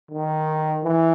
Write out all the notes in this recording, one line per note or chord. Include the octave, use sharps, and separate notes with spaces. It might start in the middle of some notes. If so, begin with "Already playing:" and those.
D#3
E3